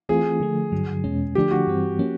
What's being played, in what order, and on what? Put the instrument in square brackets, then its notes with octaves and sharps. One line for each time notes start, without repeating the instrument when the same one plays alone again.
[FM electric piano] E3 A3 C4 F4 [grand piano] G#4
[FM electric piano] D3 F3 A3
G2 D3 F#3
E2 B2 G#3 C#4
[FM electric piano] D3 F3 A3 D4 [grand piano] G4
[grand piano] F#4
[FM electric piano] G2 E3 G3 C4
F3 A#3 C#4